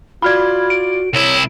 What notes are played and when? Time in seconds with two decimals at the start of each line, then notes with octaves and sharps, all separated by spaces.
0.22 F4 F#4 D5 B5 F6 G#6
0.70 D7
1.14 C2 E4 C#5